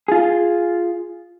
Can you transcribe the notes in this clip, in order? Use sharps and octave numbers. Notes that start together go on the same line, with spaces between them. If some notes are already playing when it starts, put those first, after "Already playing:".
F4 G#4